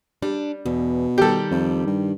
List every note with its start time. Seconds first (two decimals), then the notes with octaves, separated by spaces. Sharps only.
0.22 G3 D4
0.66 E2 B2
1.18 D#3 G3 G4 A4
1.51 F2
1.87 G2